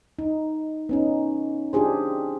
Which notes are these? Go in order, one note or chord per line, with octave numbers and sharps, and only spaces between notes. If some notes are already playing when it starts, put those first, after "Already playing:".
D#4
B3 C#4 D#4
D4 F4 G4 G#4 C5